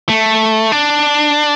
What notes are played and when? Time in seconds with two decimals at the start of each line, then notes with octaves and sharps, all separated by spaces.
0.09 A3
0.72 D4